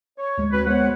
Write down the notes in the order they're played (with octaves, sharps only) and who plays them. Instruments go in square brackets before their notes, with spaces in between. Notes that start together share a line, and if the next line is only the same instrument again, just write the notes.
[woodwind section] C#5
[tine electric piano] D2 G#3
[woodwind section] C4 F#4 B4
[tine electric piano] G#3 B3 [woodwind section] C5 C#5 F#5